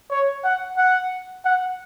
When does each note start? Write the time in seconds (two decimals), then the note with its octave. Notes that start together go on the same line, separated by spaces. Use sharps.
0.11 C#5
0.44 F#5
0.77 F#5
1.45 F#5